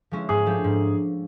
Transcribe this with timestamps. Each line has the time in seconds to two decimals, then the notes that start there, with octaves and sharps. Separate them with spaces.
0.11 F3 G#3 C#4 E4
0.29 G#2 G#4
0.46 F3 A3 D4 G4
0.64 G#2